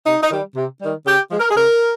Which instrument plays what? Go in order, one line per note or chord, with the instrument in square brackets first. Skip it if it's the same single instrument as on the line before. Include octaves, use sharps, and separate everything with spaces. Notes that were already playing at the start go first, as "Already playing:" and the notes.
[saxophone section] C3 D#4
D#4
D#3 G3
C3
D#3 G3
C#3 G4
F3 G#3
A#4
G#4
C#3 A#4